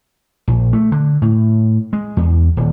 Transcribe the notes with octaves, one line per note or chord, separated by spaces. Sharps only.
A#1
A3
D3
A2
G#3
E2
D#1